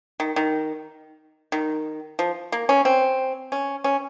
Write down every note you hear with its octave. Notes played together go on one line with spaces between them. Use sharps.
D#3
D#3
D#3
F3
A#3
C#4
C4
C#4
C#4